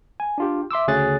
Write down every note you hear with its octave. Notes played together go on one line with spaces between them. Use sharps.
G#5
D4 F4 G4
E5 C6 D6 E6
D2 C#3 G#4 C#5 F#6 A6